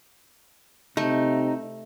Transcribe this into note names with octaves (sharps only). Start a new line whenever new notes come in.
C3 A3 D#4